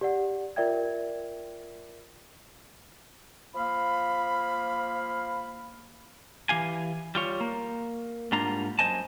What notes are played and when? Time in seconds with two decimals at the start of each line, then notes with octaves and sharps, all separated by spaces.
0.01 G4 D5 F#5
0.56 F4 A#4 D5 E5 G5 G#6
3.55 F3 A#3 F5 B5
6.49 E3 G4 F5 G#5
7.15 G3 F4 C#5
7.41 A#3
8.32 G#2 G3 A#3 D4 F4 A#5
8.79 F#2 C5 D#5 G#5 A5